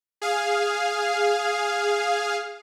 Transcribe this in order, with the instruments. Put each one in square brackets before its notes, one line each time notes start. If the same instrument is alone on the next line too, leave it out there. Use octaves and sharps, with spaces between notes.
[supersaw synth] G#4 F5